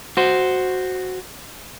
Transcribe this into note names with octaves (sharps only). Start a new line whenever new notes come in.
F#4 C5